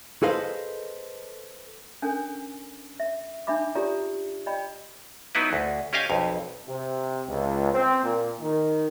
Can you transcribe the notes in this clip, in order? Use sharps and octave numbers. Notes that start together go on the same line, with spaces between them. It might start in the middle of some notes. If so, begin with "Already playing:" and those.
G#4 A4 B4 C5 D#5 F5
C#4 D4 A4 A#4 G#5
E5
D4 D#4 E5 B5 D6
F4 G4 G#4 D5 A#5 D#6
D5 D#5 G5 B5
F#3 B3 D#4 E4 B4
D2
C#4 G4 D#5 F5 G#5
B1 F2
C3
C#2
C4
A#2
D#3